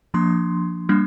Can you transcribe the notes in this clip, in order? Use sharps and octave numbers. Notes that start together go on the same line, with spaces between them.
F3 A#3 D4 C6
G3 A#3 D4